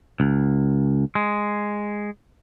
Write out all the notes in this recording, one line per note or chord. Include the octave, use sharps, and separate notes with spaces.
C#2
G#3